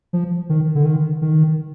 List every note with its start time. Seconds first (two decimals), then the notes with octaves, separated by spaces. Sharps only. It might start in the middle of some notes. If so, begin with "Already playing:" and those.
0.13 F3
0.49 D#3
0.75 D3
0.85 D#3
1.22 D#3